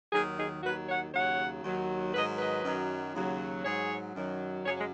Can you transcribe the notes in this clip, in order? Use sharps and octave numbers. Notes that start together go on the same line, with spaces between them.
D#2 D#3 F#3 D#4 G#4
D#4 G#4
D#2 D#3 F#3 F#4 B4
C#5 F#5
D#2 C#3 F#3 C#5 F#5
D#2 D#3 F#3
G#2 D#3 F#3 B4 D#5
B4 D#5
F#2 D#3 F#3
D#2 C#3 F#3
G#2 F#3 G#4 C#5
F#2 D#3 F#3
F#2 C#3 F#3 G#4 C#5
G#3 C#4